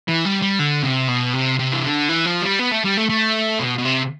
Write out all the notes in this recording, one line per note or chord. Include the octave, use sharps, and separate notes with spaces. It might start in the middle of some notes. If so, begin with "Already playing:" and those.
E3
G3
G3
D3
C3
B2
C3
C3
E3
D3
E3
F3
G3
B3
A3
G3
A3
A3
B2
B2
C3